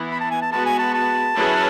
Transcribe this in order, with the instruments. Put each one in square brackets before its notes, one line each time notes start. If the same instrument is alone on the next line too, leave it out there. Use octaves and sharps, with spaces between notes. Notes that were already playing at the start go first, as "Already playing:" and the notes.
Already playing: [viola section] E3 B3 E4
[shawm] B5
A5
G#5
A5
[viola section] G#3 B3 F#4 B4 [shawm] A5
[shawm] G#5
A5
A5
[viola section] F#3 C#4 E4 G#4 B4